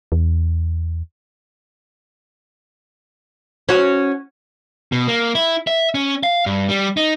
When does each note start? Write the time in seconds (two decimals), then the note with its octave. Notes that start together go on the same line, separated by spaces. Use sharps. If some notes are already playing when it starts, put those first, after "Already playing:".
0.12 E2
3.69 C#4 F#4
4.92 B2
5.08 A#3
5.35 E4
5.67 E5
5.95 C#4
6.23 F5
6.46 G2
6.69 G3
6.97 D#4